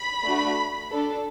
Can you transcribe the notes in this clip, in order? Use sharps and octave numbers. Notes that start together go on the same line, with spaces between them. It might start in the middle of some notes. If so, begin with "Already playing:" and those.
Already playing: B5
A3 D4 F#4
D4 A4